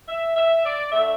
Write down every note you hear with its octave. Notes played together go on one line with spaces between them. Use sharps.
E5
E5
D5
D3 A3 E5